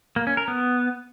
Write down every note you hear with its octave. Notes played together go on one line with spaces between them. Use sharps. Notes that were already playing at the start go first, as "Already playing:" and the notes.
A#3
C#4
A#4
B3